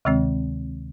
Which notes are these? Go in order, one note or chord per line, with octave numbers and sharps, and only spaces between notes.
D2 C3 D#3 G#3 C4